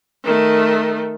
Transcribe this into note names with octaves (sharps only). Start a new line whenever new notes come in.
D#3 A3